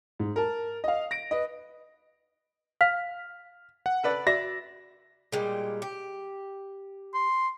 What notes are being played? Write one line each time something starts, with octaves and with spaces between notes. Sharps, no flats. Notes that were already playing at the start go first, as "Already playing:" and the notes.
G#2
A#4 A5
D#5 F5
A#6 D7
B4 D#5
F5 F6
F#5
A4 B4 D5
F#4 D5 E5 A#6
A#2 G3 G#3
G4
C6